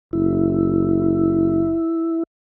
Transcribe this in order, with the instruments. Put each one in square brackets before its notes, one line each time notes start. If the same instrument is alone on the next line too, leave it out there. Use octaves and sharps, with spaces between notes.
[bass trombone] F#1 [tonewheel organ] E4